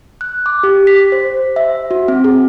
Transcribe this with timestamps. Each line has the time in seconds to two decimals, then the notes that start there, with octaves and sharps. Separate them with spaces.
0.21 F#6
0.46 D6
0.63 G4
0.87 B6
1.12 C5
1.56 E5
1.91 F#4
2.08 C4
2.24 G#4